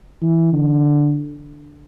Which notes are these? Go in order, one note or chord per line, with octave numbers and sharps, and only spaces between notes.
E3
D3